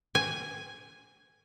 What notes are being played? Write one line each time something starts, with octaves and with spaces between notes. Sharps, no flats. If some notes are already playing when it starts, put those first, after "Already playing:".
G#5